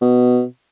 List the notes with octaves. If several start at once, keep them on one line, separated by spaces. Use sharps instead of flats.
B2